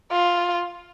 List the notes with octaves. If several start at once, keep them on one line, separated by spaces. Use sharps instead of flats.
F4